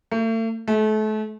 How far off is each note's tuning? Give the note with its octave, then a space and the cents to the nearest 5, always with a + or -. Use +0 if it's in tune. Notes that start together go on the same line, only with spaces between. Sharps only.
A3 +40
A3 -35